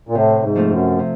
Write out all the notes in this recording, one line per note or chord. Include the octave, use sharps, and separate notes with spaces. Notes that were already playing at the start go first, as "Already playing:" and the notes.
A#2
A2 C3
G#2
F3 A3 C4 F4
F#2
C3